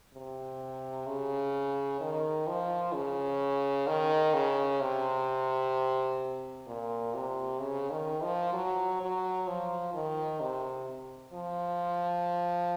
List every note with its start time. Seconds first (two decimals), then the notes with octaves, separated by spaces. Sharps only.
0.14 C3
1.07 C#3
2.00 D#3
2.47 F3
2.94 C#3
3.87 D#3
4.34 C#3
4.80 C3
6.67 A#2
7.14 C3
7.60 C#3
7.91 D#3
8.23 F3
8.53 F#3
9.01 F#3
9.47 F3
9.94 D#3
10.41 C3
11.33 F3